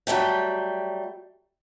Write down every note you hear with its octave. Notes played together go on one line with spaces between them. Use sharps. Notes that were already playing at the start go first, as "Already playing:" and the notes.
F#3 G3 A3 G5